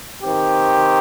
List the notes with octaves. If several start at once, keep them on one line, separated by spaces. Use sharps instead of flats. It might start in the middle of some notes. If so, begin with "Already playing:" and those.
D#3 C4 G4